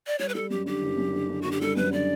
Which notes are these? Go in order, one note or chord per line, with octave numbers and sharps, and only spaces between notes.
D5
G3 C#5
B4
G3 A4
F#2 G4
D3 G4
F#1
F#2
D3
D3
D3 F#4
G4
G3 A4
F#2 B4
D3 D5